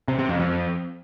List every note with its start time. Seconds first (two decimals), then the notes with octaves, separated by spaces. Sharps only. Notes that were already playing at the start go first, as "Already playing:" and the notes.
0.08 C3
0.19 C3
0.29 F2
0.40 F2